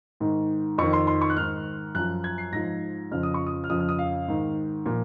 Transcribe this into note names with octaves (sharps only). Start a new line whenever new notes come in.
G#2 D#3
F2 D#3 C#6
C6
C6
C#6
F#6
G#2 D#3 F6
F#2 F3 F#6
G#6
C7
G#2 F3 A#6
F2 C#3 F3 F6
D#6
C#6
D#6
F6
F2 C#3 F3 D#6
F6
D#6
F5
G#2 D#3
A#2 F3